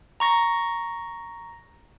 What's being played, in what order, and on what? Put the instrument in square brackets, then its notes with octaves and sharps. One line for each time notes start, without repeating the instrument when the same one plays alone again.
[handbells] A#5 C#6 A#6